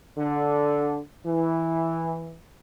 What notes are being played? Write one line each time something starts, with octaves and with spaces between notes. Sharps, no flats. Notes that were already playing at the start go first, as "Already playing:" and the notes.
D3
E3